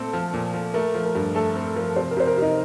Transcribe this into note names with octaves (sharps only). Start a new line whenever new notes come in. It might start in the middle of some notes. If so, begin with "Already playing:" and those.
Already playing: A#2 A3 C4 A4
F3
A#2
F3
A3 A#4
F3
A#4
G2
A3 A4
C4
F3 A#4
C3 C5
A#4
C3 C5
A#4
C3 D#4